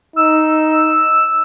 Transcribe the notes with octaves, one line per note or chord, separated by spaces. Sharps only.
D#4 E6